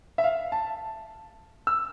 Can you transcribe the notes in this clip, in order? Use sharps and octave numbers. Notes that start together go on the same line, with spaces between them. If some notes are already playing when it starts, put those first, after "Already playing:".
E5
F5
A5
E6